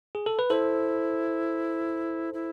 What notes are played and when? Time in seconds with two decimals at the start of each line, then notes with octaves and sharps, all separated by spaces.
0.15 G#4
0.26 A4
0.39 B4
0.50 E4 A4 C5
2.34 E4